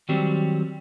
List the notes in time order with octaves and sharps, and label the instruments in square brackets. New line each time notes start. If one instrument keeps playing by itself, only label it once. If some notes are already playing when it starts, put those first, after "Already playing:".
[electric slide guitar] D#3 F#3 G3 C4